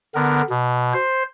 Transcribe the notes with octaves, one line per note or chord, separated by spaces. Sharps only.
D3 B3 A#4
B2
C5